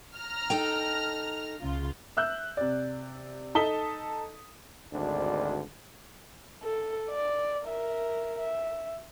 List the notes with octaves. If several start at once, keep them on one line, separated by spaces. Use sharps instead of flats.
A#5 F6
D#4 A4 G5
C#2 C#3 F4
E5 E6 F#6 G6
C3 D5
D#4 A4 A5 D#6 B6 G7
G#1 D2 D4
A4
D5
A#4 E5
E5